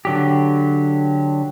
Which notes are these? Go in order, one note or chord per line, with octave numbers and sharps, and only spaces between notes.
D3 F#3 G4